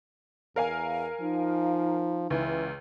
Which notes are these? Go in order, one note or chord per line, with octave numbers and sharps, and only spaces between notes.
E2 A#4 F5 G#5
F3 D#4
C#2 E3